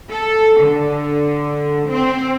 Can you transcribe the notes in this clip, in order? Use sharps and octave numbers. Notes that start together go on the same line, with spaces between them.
A4
D3
C4